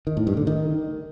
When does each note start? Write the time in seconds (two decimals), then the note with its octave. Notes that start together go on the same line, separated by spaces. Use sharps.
0.07 D#3
0.17 A2
0.27 G2
0.37 D3
0.47 D#3